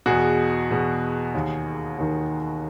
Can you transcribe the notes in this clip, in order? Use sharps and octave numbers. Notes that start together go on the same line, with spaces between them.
E2 B2 F#4 G#4
E2 B2
D#2 D#3
D#2 D#3